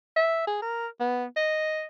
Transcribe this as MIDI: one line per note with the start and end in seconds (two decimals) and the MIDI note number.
0.16 0.43 76
0.47 0.59 68
0.62 0.87 70
1.00 1.25 59
1.36 1.86 75